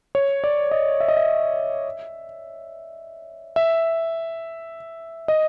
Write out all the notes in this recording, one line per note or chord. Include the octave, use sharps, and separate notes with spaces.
C#5
D5
D#5
E5
D#5
E5
E5
D#5